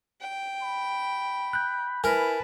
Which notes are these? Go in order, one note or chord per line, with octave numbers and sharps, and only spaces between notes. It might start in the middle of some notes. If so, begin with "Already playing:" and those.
G5
B5
F#6 G6
E4 A#4 B4 G#5 A5